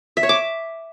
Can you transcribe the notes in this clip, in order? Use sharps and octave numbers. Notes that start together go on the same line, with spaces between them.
E5
C#5
D6